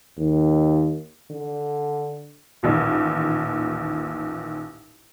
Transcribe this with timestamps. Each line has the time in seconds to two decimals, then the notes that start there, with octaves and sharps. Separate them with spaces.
0.18 D#2
1.31 D3
2.63 A1 D#2 A#2